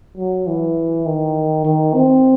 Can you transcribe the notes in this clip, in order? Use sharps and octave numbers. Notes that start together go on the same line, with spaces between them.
F#3
E3
D#3
D#3
C4